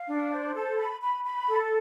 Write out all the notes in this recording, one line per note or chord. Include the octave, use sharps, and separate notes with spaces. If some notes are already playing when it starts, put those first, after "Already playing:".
Already playing: F5
D4
C5
A4
B5
B5
B5
A4